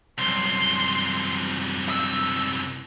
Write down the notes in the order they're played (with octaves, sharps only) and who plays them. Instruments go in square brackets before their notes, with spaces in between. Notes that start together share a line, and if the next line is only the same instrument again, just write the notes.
[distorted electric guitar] C2 F#2 [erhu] C6
[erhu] E6